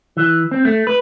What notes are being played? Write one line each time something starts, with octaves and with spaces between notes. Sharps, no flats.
E3
C4
A3
B4